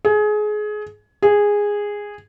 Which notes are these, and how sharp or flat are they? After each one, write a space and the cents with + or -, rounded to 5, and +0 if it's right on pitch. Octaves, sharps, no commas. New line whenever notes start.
G#4 +25
G#4 -10